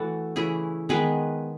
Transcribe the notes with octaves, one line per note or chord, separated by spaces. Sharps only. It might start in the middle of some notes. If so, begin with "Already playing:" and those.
Already playing: E3 A3 F#4 A4
C#3 E3 A3 E4 G#4
D#3 G#3 B3 G#4 B4